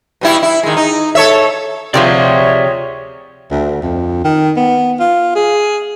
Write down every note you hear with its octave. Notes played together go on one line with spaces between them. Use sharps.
B2 G3 E4
E4
D#3 G#3
D#4
A4 C#5 E5
C3 E3 F3 G4 G#4 C#5 D5 E5
D2
F2
D#3
B3
F4
G#4